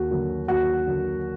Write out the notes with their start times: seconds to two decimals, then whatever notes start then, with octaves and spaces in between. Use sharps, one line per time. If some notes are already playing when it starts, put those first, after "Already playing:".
Already playing: D#2 F#4
0.10 D3 F#3 A#3
0.48 D#2 F#4
0.86 D3 F#3 A#3